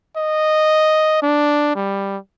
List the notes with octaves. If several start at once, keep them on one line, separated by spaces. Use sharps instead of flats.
D#5
D4
G3